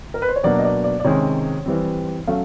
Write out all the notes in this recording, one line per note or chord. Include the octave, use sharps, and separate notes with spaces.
A#4
B4
C5
C#5
B2 F#3 A#3 D4 D5
D#5
D5
D5
D5
C3 D#3 G#3 C#4 C#5
E3 G3 C4
F#3 A3 C#4 F5